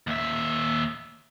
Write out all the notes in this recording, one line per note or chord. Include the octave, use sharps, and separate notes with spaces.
D#2 E5